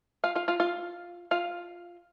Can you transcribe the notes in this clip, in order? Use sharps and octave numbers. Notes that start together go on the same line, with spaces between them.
F4 F5
F4 F5
F4 F5
F4 F5
F4 F5